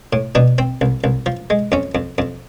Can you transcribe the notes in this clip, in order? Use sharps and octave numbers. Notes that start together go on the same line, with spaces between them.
A2
B2 D4
C4
C2
C2
F3
G#3
F2 C#4
F2
F2